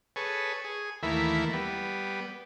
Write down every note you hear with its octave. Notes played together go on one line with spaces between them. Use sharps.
G#4 A4 B4 C#5
G#4
D#2 E3 A3 A#3 E4 B5
G3 B3